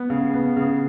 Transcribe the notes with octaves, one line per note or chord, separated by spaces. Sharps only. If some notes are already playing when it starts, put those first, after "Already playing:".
Already playing: B3
C#3
B3
C#3